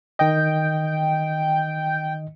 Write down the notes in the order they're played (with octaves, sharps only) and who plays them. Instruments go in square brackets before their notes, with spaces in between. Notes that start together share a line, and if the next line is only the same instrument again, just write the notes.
[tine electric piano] D#3 D#5 [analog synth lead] G5